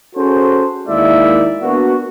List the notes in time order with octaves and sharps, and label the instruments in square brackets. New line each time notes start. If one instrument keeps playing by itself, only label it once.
[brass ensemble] C#4 F#4 G#4 A4 C5
D#2 G#3 A#3 E4 D5 E5
A#3 B3 D4 F#4